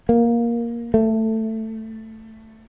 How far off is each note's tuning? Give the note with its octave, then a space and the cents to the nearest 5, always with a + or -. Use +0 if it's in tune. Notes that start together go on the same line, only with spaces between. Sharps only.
A#3 +10
A3 +10